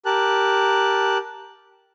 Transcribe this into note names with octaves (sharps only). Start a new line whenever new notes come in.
G4 A#4 A5 F#6